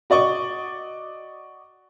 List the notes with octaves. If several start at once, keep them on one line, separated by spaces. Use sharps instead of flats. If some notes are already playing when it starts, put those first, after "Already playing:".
F#4 D5 D#5 C#6